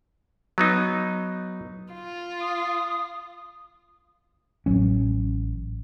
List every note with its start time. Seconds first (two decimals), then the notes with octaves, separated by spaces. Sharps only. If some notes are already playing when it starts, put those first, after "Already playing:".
0.58 F#3 B3 D#4
1.93 F4
2.41 D#6
4.66 A1 F#3 C#4